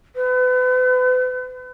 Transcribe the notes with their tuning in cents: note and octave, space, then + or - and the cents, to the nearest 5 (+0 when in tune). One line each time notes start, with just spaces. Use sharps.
B4 +35